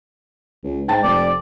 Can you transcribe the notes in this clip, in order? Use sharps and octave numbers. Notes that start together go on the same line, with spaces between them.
C#2
G#2 G5 A5 A6
F1 D5